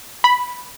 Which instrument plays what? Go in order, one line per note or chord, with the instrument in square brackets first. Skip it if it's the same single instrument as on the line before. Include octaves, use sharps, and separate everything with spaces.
[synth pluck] B5